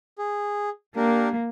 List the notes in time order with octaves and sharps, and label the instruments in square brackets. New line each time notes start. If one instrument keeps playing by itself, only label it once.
[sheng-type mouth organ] G#4
[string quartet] A#3 [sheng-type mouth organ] D4 G4 A#4